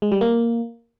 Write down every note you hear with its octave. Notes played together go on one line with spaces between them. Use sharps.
G#3
G3
A#3